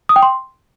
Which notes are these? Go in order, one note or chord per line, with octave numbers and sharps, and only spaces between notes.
D#6
G5
C6